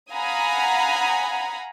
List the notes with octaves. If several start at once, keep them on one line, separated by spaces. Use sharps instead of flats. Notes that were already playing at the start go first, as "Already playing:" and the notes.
F5 F#5 G#5 A#5 B5 D#6